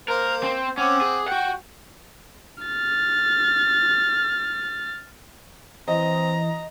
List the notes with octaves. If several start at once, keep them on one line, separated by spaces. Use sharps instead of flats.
A#3 A#4 C5
C4
C4 C#4 F#5 D6
G#4
F#4 F#5 G5
F6 A6
E3 C4 D#5 A#5